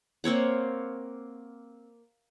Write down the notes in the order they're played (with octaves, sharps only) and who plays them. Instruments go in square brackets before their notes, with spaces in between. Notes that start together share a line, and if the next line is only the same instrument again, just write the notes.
[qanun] A#3 C4 C#5 F#5